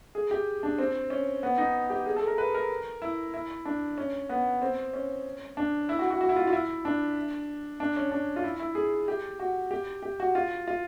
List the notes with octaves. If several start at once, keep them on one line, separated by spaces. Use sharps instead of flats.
G#4
G4
D4
C4
C#4
B3
D#4
G4
G#4
A4
A#4
B4
A#4
E4
E4
D4
C#4
B3
C4
C#4
D4
E4
F#4
F#4
F#4
E4
F4
F4
E4
D4
D4
C#4
D4
F4
E4
E4
G#4
G4
F#4
G4
G4
F#4
F4
F4